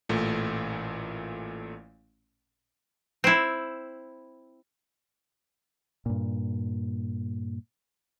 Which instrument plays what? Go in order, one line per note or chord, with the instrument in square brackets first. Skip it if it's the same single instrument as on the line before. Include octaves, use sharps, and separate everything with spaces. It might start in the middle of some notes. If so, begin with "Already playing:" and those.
[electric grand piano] A1 A#2 A3
[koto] C4 E4
[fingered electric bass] G2 A#2